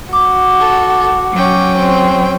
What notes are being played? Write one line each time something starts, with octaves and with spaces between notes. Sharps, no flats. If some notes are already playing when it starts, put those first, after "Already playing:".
F#4 D6
A4
F#3 C#4 G5
C4